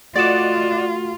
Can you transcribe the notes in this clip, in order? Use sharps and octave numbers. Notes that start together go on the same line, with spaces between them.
A3 F4 F#4 D5 D#5 F#5 A6 E7